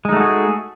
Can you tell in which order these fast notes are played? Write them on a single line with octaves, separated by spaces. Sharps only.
G#3 D#4 A3 F#4 G#4